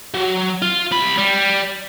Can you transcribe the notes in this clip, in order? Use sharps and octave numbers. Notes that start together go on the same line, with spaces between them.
F#3
F4
C2 B5
G3